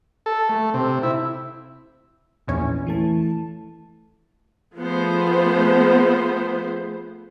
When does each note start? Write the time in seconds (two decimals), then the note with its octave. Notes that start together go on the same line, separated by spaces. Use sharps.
0.26 A4
0.49 A3
0.74 C3
1.03 E4
2.48 A#1 E2 C#4
2.87 E3 A3 A5
4.78 F3 A3 B3 G#4 C5